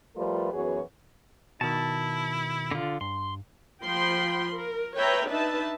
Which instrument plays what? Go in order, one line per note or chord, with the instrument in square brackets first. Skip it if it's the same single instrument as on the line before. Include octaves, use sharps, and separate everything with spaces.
[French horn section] F3 G3 A3 F4 A#4 B4
F#2 E3 B3 F#4 G#4 C#5
[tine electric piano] B2 D#3 [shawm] E4 [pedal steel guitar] A5
[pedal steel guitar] D3 F4
[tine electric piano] G2 [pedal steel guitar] C6
[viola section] F3 G5 B5 C6
A#4
B4 C#5 E5 G5 A#5
D4 D#4 B4 E5 A5